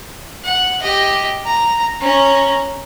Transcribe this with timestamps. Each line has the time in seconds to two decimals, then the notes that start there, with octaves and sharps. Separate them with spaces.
0.45 F#5
0.82 G4 D#5
1.46 A#5
2.01 C#4 A#5